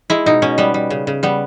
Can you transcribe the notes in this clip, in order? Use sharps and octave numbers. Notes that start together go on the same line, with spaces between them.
G#3 E4
B2 D#4
B2 C#4
G3 B3
G3
C#3
C#3
G3 B3